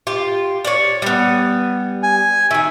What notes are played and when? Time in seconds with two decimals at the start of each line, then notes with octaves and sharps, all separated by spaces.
0.07 F4 G4
0.64 C#5 D5
1.02 G3 B3
2.03 G#5
2.51 D#3 G#4 E5